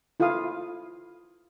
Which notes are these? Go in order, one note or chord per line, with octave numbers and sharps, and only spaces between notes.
E4 F4 A4 F5 D#6